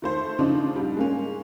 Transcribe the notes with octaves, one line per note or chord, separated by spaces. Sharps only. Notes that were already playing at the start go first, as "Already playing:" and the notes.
D#3 A3 C5
C#3 F3 D4 D#4
G#2 G3
G#3 A#3 C#4